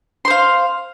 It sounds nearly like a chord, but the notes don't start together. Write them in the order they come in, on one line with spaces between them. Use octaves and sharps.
C6 C5 F5